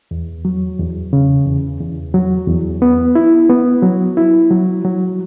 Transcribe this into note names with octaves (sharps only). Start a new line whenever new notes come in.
E2
F#3
E2
C#3
E2
E2
F#3
E2
B3
E4
B3
F#3
E4
F#3
F#3